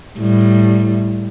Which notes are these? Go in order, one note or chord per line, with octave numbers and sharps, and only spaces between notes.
A2 G3